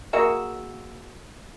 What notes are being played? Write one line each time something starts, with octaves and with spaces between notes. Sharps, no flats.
A#3 F#4 G#4 E5